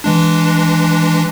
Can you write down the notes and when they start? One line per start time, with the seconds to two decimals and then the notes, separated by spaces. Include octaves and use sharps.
0.04 E3 G#3 D4